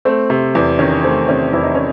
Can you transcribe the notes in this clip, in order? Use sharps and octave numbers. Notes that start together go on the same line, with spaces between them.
A3 C4
C3
E2
D#3 C#4
A3 C4
C3 C#4
E2 E4
D#4
C#4